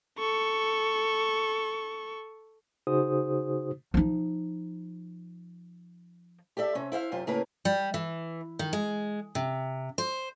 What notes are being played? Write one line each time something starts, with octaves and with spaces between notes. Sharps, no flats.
A4 C#6
C#3 D#4 F#4 G#4 C5 D#6
F3 D#4
G4 A4 D5 E5
C3 C#4
E4 C5 E5 F5
F#2 C3 F4
A2 C#3 A#3 C#4 A#4 B4
G3
E3
D#3
G#3
C3
C5